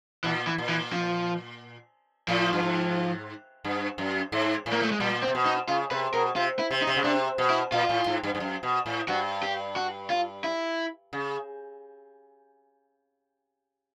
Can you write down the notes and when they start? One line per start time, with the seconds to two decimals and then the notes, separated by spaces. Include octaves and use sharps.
0.24 A#2 E3
0.47 E3
0.58 A#2
0.69 E3
0.92 F3
2.28 A2 F3
2.53 G2
2.63 G#2
3.64 G2
3.98 F#2
4.32 G#2
4.66 A2
4.73 A#3
4.82 A3
4.92 G#3
5.00 A#2 G3
5.23 C4
5.28 C3
5.35 B2
5.46 D#4
5.68 C#3 F4
5.91 C3 B4
6.14 B2 A#4
6.36 C3 F4
6.59 E4
6.71 C3
6.82 D#4
6.87 C3
6.96 C#3
7.04 C3 D4
7.38 B2
7.50 E4
7.72 A#2 F4
7.89 A2
8.06 G#2
8.23 G2
8.35 G2
8.40 F#2
8.63 B2
8.86 A2
9.08 G2 F#4
9.43 G4
9.76 F#4
10.10 F4
10.44 E4
11.13 C#3